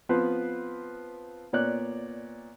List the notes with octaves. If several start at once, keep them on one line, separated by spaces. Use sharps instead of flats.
F3 B3 C4 B4
A#2 B3 C#5 D5 F#6